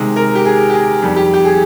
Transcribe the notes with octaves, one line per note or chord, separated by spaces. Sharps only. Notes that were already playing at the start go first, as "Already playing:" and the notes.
Already playing: C3 D#3 G#3
A#4
G4
G#4
G4
G#4
F2 D#3 G3
G4
G4
G#4